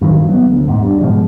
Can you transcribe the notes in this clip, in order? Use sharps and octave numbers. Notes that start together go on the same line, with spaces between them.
G2 D#3 E3 F#3
F#3 A#3 B3
D2
E2 G#2
G2
G#2 B2 F3 G#3